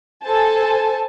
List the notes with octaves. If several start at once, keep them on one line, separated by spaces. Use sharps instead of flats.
A4 C5 G#5 A5